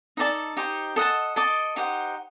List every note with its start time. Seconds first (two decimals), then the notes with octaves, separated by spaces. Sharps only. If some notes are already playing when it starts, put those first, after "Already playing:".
0.17 D#4 A4 D5 A5
0.57 D#4 G4 C5
0.96 A4 D#5 F#5 A5
1.36 A4 D#5 A5 D6
1.76 D#4 G4 C5 F#5